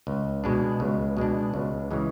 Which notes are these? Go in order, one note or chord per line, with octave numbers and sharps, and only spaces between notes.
C#2
B2 G#3 D4
C#2
B2 G#3 D4
C#2
C#3 E3 G#3